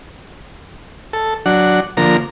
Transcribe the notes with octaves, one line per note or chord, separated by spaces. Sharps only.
A4
F#3 D4 F#5
D3 F3 A#3 A#5